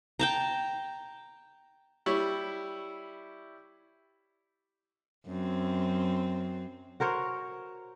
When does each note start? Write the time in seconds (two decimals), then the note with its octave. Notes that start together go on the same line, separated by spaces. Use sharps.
0.19 G5 A5 A#5
2.06 G3 E4 C#5
5.27 F#2 C4
7.00 F#4 A#4 C5 C#5